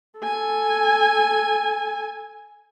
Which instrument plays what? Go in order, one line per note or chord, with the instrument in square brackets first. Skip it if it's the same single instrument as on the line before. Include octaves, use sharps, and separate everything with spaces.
[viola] A4 G#5